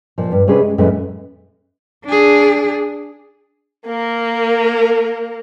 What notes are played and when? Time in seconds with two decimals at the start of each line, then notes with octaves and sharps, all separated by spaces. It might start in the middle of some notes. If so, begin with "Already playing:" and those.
0.18 A#2 F3
0.32 G2
0.47 C3 C#4 D4 G#4 B4
0.60 G#3
0.78 F#2 A#2 E3 G#3 A3
2.05 D4 G#4
3.86 A#3 A#4